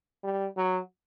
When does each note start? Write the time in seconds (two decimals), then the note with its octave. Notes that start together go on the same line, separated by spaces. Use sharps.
0.23 G3
0.57 F#3